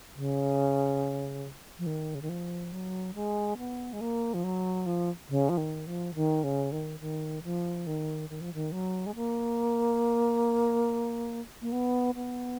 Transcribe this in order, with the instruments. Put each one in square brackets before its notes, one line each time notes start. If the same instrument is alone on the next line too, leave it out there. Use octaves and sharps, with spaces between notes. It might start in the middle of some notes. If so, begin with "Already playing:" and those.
[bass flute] C#3
F3
D#3
C#3
D#3
F3
F#3
G#3
B3
G#3
A#3
F3
F#3
F3
C#3
F3
D#3
F3
D#3
C#3
D#3
D#3
F3
D#3
D#3
F3
D#3
F#3
G#3
A#3
A#3
B3
B3